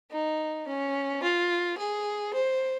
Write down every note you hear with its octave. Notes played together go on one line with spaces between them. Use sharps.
D#4
C#4
F4
G#4
C5